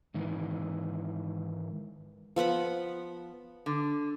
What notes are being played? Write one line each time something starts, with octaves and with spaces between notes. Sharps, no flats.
G#2 D#3 E3
F3 B3 F#5 B5
D3